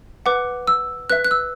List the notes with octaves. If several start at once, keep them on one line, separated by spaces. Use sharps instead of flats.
B4 F#5 D6
E6
B4 E5 F#6
F#6
E6